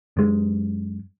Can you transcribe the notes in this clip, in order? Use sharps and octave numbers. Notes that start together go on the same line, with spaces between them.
F#2 G#3